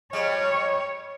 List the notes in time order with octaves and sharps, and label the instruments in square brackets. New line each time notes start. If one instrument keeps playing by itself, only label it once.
[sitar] F2 G3 G#3 [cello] C#5